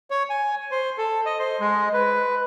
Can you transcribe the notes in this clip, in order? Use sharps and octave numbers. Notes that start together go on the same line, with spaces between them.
C#5
G#5
C5
A4
D#5
C5
G#3
B4